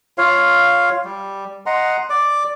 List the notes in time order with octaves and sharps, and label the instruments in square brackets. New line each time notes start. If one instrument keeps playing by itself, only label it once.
[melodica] F4 C#5 F5
G3
D#5 F#5 A#5 C6
D5 D6